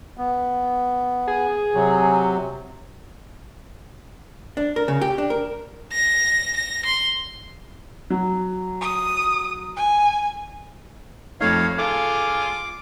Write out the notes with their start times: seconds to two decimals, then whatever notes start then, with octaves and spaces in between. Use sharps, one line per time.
0.18 B3
1.28 G#4
1.75 C3 F#3
4.57 D4
4.76 A#4
4.88 C#3
5.01 G4
5.18 D4
5.30 A#4
5.92 A#6
6.56 A#6
6.85 C6
8.10 F#3
8.81 D#6
9.76 G#5
11.41 F2 A3 D#4 C#5 F5
11.78 F4 G#4 A4 F5 D6